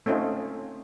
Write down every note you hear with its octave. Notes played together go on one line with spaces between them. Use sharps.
A3 C4 C#4 D#4 F4